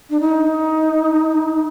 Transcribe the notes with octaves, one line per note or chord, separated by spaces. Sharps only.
D4
D#4